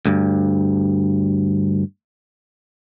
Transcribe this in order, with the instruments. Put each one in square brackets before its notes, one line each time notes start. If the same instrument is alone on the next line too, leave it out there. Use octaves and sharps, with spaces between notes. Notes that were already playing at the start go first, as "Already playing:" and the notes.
[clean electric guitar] D2 G2